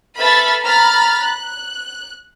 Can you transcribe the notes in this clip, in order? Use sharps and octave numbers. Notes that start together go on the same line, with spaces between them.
A4 B4 E5 B5 F6 A6
A#5 B5 F6 A6
F#6